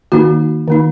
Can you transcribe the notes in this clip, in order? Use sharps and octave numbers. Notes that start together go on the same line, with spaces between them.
D#3 A#3 D#4 F#4
D#3 A#3 D#4